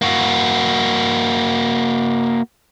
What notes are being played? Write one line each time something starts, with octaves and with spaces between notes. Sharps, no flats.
A#3 F#4